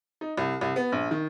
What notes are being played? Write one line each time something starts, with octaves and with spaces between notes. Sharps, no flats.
D#4
C2
C2
B3
A#1
D#3